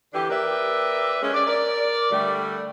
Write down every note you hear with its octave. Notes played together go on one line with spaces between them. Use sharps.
D3 E3 D4 G4
A#3 G4 A#4 B4 D5 E5
G#3 C#4
D5
A#4 D5
D3 G3 A3